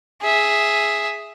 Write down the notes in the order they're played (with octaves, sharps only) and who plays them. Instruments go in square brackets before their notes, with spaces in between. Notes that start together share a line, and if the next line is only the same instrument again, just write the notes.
[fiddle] G#4 E5